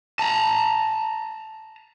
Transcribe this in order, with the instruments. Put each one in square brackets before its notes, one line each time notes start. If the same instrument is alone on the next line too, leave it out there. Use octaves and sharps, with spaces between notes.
[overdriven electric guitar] A5 A#5